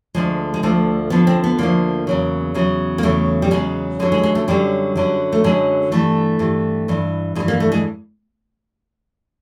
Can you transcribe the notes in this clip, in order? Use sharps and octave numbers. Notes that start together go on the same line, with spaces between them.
D2 D3 F3 G#3
G#3
D2 D3 F3 A3
D2 D3 F3 B3
C4
B3
D2 D3 F3 A#3
E2 C#3 F#3
E2 C#3 F#3
A#3
E2 C#3 F#3 A3
G3
E2 C#3 F#3 G#3
F#2 D3 F#3 G#3
G#3
G#3
A3
F#2 D3 F#3 G3
F#2 D3 F#3
A3
F#2 D3 F#3 G#3
G2 E3 A3
G2 E3
G2 E3
G2 E3 G#3
A#3
A3
G#3